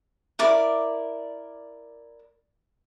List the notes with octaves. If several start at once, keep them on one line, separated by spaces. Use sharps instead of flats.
E4 A#4 D5